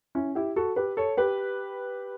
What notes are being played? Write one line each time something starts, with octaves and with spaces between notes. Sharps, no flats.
C#4 E4
E4 G4
F#4 A4
G4 B4
A4 C#5
G4 B4